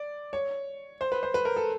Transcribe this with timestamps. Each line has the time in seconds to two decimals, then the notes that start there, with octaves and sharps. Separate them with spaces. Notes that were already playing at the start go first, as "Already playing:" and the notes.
Already playing: D5
0.33 C#5
1.01 C5
1.12 B4
1.23 C5
1.34 B4
1.45 A#4
1.56 A4